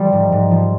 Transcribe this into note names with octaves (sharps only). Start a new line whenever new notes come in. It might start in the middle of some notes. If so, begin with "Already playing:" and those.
Already playing: F3 G3
G#2
G#2
F3